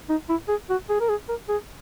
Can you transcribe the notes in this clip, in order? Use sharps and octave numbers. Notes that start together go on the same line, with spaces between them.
D#4
E4
G#4
F#4
G#4
A#4
G#4
A#4
G#4